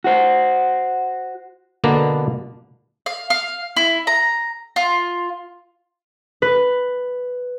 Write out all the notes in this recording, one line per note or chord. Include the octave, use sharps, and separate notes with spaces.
F#4 C5
B2 D3 A#3 B3 D4 A#5
F5
F5
E4
A#5
F4
B4